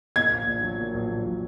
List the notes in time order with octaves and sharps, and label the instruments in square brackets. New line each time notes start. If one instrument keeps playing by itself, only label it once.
[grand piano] A#2 [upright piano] G#6
[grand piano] A#1
A#1
F#3
A#2
A#1
A#1
F#3